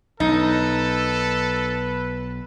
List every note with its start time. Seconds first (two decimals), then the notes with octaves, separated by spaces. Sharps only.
0.20 B1 D#4 A4 B4